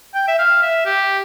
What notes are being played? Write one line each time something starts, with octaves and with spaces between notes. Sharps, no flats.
G5
E5
F5
E5
G4